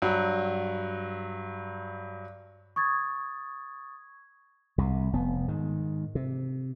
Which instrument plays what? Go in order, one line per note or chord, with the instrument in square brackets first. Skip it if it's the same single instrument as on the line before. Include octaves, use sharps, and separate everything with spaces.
[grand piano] G2 F#3
[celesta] C#6 D#6 G#6 A6
[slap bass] C2 C3
F1 B3
G#2 D#3
C3